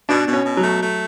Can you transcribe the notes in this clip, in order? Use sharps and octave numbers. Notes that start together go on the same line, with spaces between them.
B2 D4
B2
C#4
B2
F#3
A3
A3